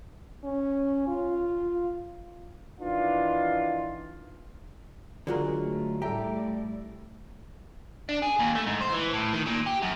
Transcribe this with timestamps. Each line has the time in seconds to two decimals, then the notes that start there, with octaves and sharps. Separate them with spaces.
0.44 C#4
1.08 F4
2.80 D#3 E3 D4 F4
5.27 D3 F#3 G#3 D4 F4 A#4
5.59 A3
6.02 A2 G3 G4 A4 D5 E5 A#5
8.09 D4
8.22 G#4
8.39 D#2
8.55 A3
8.66 G#2
8.81 C5
8.92 E3
9.13 A2
9.33 D#3
9.46 A#2
9.66 G4
9.82 F#2